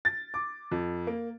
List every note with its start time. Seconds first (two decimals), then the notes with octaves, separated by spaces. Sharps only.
0.05 A6
0.34 D6
0.71 F2
1.07 A#3